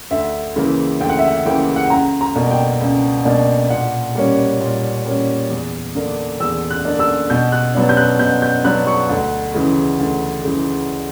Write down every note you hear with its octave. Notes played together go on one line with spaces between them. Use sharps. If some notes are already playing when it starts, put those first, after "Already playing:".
D2 E5
C#3 E3 A#3
D2 G5
F#5
E5
F#5
C#3 E3 A#3 G5
F#5
G5
C#2 A#5
A#5
B2 A#3 D4
G5
C#2
B2 A#3 D4
A#2 F#5
G3 A#3 C#4
A#2
G3 A#3 C#4
E2
D3 A#3 D4
E2 E6
F#6
D3 A#3 D4
E6
B2 G6
F#6
F#3 B3 D4
G6
F#6
B2 G6
G6
F#3 B3 D4 F#6
C#6
D2
C#3 E3
D2
C#3 E3